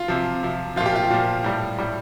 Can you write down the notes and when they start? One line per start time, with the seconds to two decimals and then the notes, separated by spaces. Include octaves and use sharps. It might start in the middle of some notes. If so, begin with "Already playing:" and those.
Already playing: F4
0.08 C3 F3
0.43 C3 F3
0.76 A#2 F3 F4
0.86 G4
0.96 F4
1.11 A#2 F3
1.44 A2 G3
1.78 A2 G3